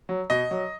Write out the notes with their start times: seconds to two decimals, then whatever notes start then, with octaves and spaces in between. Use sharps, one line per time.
0.09 F#3
0.30 B2 D#5
0.51 F#3